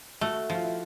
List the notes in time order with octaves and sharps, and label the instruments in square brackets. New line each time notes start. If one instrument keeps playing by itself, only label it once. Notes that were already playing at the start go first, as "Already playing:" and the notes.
[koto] A3 [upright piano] F#4
[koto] F3
[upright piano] F4
E4